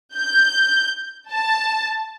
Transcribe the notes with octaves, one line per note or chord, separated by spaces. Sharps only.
G6
A5